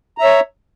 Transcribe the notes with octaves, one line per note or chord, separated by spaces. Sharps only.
C#5 E5 A#5